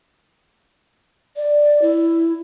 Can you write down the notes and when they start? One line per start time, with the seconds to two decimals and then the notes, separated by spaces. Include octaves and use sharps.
1.36 D5
1.82 E4